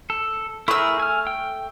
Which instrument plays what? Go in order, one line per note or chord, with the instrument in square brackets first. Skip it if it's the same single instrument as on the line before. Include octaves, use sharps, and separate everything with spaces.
[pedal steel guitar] A4
[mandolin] A3 E6 [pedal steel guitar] E4 G#4 A#4
[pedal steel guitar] G#5 F6
G5